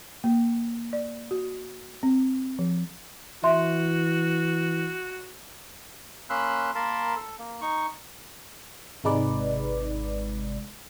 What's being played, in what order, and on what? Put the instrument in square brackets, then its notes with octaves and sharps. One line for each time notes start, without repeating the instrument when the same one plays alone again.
[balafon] A#3
D5
F#4
C4
F3
[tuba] E3 [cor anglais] F#4 [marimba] E5 C6
[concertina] A#3 C#4 B5 C6 E6 F#6
A#3 A#4 A5 B5 C6
A4
A#3
D#4 C#6
[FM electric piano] G#1 C3 G#3 D#4 B4 D5